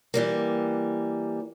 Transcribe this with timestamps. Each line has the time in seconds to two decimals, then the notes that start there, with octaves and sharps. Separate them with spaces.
0.14 E3 G3 A#3